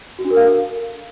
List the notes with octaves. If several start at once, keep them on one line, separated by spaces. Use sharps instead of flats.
F#4
D4
A#4
F5
A4